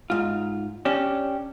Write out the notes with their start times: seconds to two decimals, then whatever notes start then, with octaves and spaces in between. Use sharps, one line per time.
0.10 G#2 F4
0.85 C#4 D4 G4